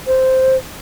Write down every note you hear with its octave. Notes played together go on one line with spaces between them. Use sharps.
C5